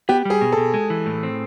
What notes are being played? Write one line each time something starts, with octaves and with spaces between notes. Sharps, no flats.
B3 G4
G3 G#4
B2
B2 A4
G#3
E3
A2
C4